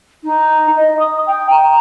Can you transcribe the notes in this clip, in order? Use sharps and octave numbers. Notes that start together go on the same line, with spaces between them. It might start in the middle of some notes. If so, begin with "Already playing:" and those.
D#4
D#5
D#6
G5
A#5